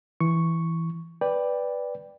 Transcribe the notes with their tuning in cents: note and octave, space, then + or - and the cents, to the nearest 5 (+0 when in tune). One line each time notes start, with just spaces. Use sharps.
E3 +0 C#6 +0
B4 +0 D5 +0 G5 +5